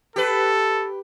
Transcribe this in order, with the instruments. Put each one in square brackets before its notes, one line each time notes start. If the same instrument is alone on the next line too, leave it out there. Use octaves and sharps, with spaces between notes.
[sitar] G4 B4 [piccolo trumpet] A4